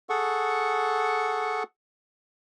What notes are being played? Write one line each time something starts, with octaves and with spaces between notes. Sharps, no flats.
G#4 A4 F#5 C#6